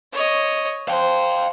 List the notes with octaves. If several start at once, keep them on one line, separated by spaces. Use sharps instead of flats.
C#5 D#5
C5 F5 G5